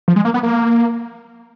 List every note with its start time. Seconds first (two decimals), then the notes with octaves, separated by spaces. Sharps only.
0.08 F3
0.16 G#3
0.25 A#3
0.34 B3
0.43 A#3